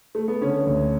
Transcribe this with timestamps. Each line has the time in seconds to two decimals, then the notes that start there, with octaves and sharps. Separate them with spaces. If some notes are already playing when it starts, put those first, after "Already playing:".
0.15 A3
0.28 B3
0.41 D3 C#4
0.66 D2